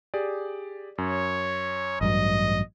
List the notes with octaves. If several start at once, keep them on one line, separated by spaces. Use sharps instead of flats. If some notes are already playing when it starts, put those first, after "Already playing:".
G4 G#4 D5
F#2 C#5
A1 G2 F#3 D#5